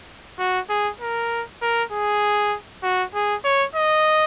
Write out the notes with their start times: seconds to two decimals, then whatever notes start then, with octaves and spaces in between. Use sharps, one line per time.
0.39 F#4
0.69 G#4
1.01 A#4
1.62 A#4
1.92 G#4
2.83 F#4
3.15 G#4
3.44 C#5
3.75 D#5